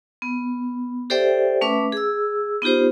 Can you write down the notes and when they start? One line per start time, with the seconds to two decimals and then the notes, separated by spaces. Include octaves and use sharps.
0.22 B3
1.10 G4 A4 C5 D5 E5 G5
1.61 A3 C#4 B4 E5 D6
1.92 G#4 E6
2.62 B3 D#4 F4 G4 C5